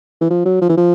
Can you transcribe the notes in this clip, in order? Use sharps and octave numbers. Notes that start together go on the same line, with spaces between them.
E3
F3
F#3
F3
E3
F3